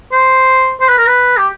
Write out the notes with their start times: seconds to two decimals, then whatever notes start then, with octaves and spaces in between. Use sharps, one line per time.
0.12 C5
0.80 C5
0.89 B4
0.97 A#4
1.07 B4
1.37 G4